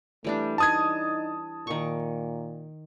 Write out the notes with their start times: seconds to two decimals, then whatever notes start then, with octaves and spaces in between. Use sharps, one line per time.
0.24 E3 G3 A3 D4
0.58 D#4 A5 D#6 G#6
1.67 A#2 D#3 C#6